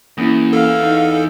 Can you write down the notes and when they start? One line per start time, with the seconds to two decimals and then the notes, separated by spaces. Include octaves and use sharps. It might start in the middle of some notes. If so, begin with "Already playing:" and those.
0.18 E2 A#3 C#4 E4
0.53 A4 F5
0.83 D#4